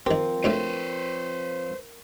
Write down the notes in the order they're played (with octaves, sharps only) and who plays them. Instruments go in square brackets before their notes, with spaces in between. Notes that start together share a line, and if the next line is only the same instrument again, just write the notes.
[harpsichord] D#3 G4 [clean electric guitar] F3 C4 [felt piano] A#4
[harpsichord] D2 A2 A3 [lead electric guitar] B4 C5